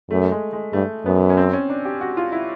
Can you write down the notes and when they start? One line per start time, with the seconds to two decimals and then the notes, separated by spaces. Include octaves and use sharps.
0.11 F#2 A3
0.31 G#3
0.53 G#3
0.73 G2 A3
1.06 F#2 B3
1.30 C#4
1.37 C4
1.53 C#4
1.70 D4
1.85 G4
2.01 F#4
2.17 F4
2.32 E4